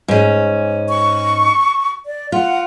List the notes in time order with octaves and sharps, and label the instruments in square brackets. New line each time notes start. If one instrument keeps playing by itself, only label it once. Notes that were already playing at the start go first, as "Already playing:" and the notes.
[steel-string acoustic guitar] G#2 C#4
[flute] C#6
D5
[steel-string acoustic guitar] F4 [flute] F#5